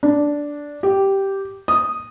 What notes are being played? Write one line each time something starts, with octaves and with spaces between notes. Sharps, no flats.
D4
G4
D#6